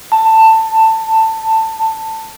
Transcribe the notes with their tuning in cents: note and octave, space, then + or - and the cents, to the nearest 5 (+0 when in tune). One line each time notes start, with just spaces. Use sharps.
A5 +15